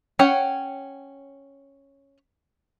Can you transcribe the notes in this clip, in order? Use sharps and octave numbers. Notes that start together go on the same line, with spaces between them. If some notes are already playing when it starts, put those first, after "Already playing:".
C#4 C#5 F#5 G5